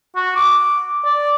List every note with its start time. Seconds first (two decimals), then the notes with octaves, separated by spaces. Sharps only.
0.16 F#4
0.36 D6
1.05 D5